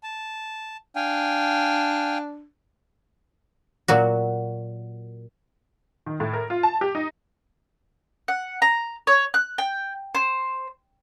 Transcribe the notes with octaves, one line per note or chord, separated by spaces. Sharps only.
A5
D4 F5 G5 G#5
A#2 F#3 F#4
D#3
A2
A#4
F4
A5
G4
D#4
F#5
A#5
C#5
F#6
G5
C5